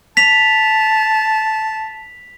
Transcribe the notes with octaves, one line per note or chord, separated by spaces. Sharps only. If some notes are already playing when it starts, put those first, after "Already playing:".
A5 B6 F7